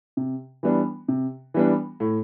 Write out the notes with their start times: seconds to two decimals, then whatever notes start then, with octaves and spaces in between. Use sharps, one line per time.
0.17 C3
0.63 E3 G3 B3 D4
1.08 C3
1.54 E3 G3 B3 D4
2.00 A2